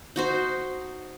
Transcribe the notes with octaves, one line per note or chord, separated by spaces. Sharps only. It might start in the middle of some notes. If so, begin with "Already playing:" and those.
D#4 F#4 C5